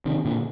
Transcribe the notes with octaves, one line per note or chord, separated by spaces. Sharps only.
C3 D#3
A#2 D3